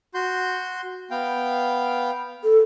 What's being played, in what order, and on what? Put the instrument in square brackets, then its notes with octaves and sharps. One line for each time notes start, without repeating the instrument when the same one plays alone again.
[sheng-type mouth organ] F#4 C6 G6
B3 F5 G5
[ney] A4